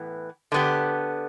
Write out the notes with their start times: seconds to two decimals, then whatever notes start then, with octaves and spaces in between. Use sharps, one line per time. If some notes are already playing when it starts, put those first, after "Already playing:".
Already playing: A2 E3 B3
0.52 D3 B3 G4